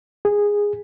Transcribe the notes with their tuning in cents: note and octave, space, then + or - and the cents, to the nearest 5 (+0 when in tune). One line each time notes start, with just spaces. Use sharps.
G#4 -10